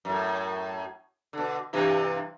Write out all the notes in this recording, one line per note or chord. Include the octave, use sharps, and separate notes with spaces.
F#2 A2
B2 D3
G2 C3 E3